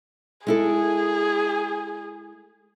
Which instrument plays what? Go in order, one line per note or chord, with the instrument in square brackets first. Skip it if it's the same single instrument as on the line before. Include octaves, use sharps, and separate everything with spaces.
[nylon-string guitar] G#3 E4 A4 [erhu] G#4